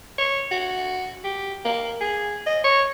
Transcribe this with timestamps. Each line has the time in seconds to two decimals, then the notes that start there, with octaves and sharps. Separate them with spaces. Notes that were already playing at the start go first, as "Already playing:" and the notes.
0.18 C#5
0.51 F#4
1.24 G4
1.65 A#3
2.01 G#4
2.46 D#5
2.64 C#5